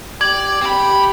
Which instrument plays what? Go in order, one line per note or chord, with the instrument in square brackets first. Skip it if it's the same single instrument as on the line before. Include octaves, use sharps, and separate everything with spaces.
[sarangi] G4 [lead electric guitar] D5 [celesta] G#6 F#7
[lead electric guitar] C4 B5 [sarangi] G4